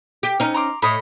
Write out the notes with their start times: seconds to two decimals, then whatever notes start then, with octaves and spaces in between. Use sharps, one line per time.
0.23 G4
0.40 C#4 D#4
0.54 A#5 C6 D6
0.82 A2 C#5 D#5 B5